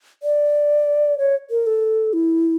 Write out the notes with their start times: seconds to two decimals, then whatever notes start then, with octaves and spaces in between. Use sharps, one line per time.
0.23 D5
1.18 C#5
1.50 A#4
1.67 A4
2.13 E4